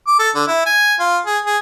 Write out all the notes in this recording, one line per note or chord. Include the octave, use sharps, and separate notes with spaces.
D6
A4
D3
E4
G#5
F4
G#4
G#4